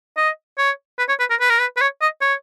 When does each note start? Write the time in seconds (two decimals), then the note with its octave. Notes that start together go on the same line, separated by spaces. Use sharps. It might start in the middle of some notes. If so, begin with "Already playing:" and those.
0.17 D#5
0.58 C#5
0.98 B4
1.09 C#5
1.19 B4
1.30 A#4
1.40 B4
1.49 A#4
1.59 B4
1.77 B4
1.81 C#5
2.01 D#5
2.21 C#5